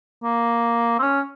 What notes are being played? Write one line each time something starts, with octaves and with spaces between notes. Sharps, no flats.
A#3
C4
C#4